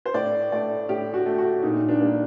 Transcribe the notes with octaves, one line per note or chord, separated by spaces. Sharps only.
C5
A2 D5
A3 D5
A2 G4
F#4
A3
F#4
A#2 D#4
D4
G3 A#3